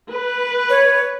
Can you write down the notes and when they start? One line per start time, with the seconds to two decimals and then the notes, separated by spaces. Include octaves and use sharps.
0.10 B4
0.70 C#5